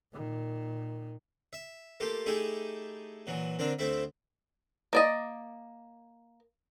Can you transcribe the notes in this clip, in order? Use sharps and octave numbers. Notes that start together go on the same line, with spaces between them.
A#2 D#3
E5
A3 A#3 F4 G4
A3 D#4 E4 G4 G#4
A#2 E3 F#3
D3 C4 D4 A#4
D2 A3 C4 E4 E5
A#3 D5 D#5